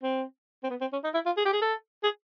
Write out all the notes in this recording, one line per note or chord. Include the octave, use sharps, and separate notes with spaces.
C4
C4
B3
C4
C#4
D#4
E4
F4
G#4
G4
G#4
A4
G#4